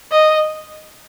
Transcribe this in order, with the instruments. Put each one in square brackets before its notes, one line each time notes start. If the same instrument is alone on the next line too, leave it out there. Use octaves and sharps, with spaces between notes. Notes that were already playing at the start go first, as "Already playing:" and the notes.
[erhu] D#5